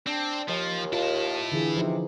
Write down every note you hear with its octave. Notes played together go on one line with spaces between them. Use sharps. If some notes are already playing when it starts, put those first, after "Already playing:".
C4 D4
D#2 F3
E4 F4 A5
D3 E3 G#4
C3 F3 D#4